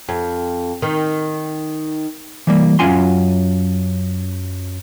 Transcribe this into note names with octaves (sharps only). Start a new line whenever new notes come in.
F2
D#3
E3 G3 A#3
F#2 F#3 C#4 F4 G#5 C6